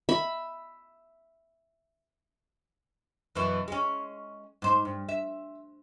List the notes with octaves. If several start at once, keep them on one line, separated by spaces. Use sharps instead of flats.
E5 B5
F#2 B2 E3
G#3 C#4
G#2 C5
G2
E5